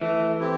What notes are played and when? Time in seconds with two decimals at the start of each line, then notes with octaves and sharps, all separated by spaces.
0.01 E3 A3
0.40 C4 E4 G4